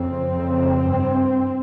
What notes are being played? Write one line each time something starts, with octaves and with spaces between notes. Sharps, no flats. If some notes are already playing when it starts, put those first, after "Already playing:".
Already playing: F2 C#3 C4
F2 C#3
G2